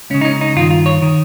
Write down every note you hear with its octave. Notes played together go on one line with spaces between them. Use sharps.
C#2 C#3 C#4
D#4
C#4
D#4
G2 D#3 F4
F4
C#5
D#3